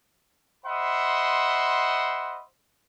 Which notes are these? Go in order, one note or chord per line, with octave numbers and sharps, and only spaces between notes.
C5 D#5 E5 F#5 B5 C6